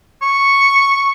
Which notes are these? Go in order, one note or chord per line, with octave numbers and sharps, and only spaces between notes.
C#6